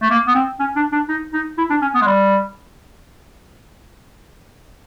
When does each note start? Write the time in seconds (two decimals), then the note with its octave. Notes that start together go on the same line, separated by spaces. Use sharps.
0.02 A3
0.10 A#3
0.27 B3
0.35 C4
0.59 C#4
0.76 D4
0.92 D4
1.09 D#4
1.33 D#4
1.58 E4
1.70 D4
1.82 C#4
1.94 B3
2.01 G#3
2.07 G3